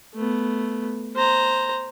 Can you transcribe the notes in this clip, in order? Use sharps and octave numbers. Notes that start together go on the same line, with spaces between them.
A3 B3
C5 A#5